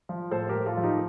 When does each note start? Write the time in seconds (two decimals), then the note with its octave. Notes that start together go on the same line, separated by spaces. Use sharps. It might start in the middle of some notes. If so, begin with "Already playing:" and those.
0.09 F3
0.31 A2 A4 C5
0.49 G4 A#4
0.54 A2
0.66 F4 A4
0.77 F3
0.83 D#4 G4